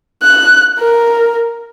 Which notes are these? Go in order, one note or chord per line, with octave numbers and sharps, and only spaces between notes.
F#6
A#4